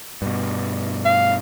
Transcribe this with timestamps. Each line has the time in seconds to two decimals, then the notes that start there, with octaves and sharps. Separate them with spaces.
0.22 G2 B2
1.05 F5